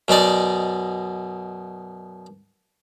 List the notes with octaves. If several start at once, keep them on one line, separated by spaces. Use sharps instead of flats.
F#2 B2 D#4 D5